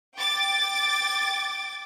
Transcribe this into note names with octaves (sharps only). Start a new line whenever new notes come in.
G5 D6 A6